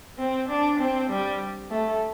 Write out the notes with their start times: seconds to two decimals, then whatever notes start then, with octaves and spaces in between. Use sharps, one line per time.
0.18 C4
0.49 D4
0.80 C4
1.10 G3
1.71 A3